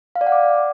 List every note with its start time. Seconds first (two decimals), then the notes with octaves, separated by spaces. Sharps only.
0.16 F5
0.21 D5
0.27 F#5
0.32 D6